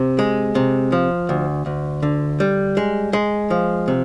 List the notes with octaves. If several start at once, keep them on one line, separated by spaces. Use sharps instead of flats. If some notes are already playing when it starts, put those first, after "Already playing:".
Already playing: C3
G#3
C3
F3
D2
D2
D3
G3
G#3
G#3
F3
C3